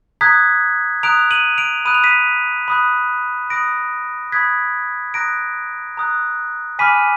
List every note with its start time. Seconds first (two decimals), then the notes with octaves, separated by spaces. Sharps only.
0.21 A#5 D#6 F#6 G#6 B6
1.03 A#5 D#6 F#6 D7 F7
1.31 D#7 F#7
1.58 D7 F7
1.85 B5 D#6 F#6 D#7
1.94 F7
2.04 B6 D#7
2.68 B5 D#6 F#6
3.50 B5 D#6 F#6 A#6 D7
4.32 B5 D#6 F#6 G#6 B6
5.14 A#5 D#6 F#6 A#6 D7
5.97 A#5 D#6 F#6
6.79 G#5 B5 D6 F6 B6 D#7